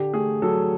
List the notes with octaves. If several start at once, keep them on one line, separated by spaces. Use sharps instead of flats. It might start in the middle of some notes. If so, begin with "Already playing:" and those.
Already playing: D3 G4
A3 G#4
F#3 A4